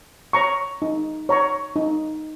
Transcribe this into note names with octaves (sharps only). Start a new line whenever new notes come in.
C#5 A#5 C#6
D#4
C#5 A#5 C#6
D#4